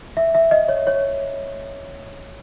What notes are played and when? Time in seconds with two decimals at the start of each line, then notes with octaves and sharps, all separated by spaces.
0.17 E5
0.34 E5
0.51 D#5
0.68 C#5
0.87 C#5